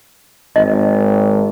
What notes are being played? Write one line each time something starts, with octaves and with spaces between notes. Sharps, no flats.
G#1 D#5